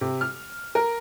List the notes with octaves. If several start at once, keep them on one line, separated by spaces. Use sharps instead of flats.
C3
F6
A#4